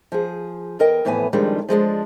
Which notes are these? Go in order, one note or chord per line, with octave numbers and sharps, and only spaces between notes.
F3 G#4
E2 A#4 D#5 G5
F2 A2 E3 B3 B4 G#5
F2 D#3 G3 G#3 D4 F4
F3 G#3 B3 D4